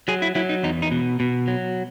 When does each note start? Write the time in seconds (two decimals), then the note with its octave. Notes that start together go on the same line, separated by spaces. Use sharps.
0.08 F#3 G#4
0.22 E4
0.35 F#3 E4
0.49 D#4
0.63 E2 D#4
0.82 D#4
0.91 B2
1.20 B2
1.47 F#3